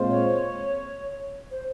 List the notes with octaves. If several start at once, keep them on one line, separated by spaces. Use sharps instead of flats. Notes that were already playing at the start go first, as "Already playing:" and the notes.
Already playing: A#2 G#3 C4 F4 C5
C#5
C5